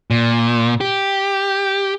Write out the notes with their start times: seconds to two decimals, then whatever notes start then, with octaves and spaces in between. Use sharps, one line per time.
0.10 A#2
0.81 G4